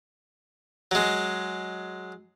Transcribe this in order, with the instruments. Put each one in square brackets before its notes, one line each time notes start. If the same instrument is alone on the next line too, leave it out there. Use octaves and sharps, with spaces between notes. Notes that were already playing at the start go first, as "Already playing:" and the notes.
[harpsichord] F#3 G#3